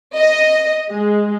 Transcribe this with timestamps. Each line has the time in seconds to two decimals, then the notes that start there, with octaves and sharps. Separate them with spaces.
0.16 D#5
0.89 G#3